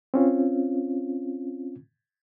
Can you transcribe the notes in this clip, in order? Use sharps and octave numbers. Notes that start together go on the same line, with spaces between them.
C4 C#4 F4